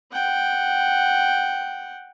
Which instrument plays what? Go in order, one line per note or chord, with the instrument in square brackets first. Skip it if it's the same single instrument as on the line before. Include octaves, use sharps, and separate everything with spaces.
[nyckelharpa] F#5 G5